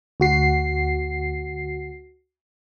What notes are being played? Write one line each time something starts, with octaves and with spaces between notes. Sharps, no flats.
D2 F#4 C7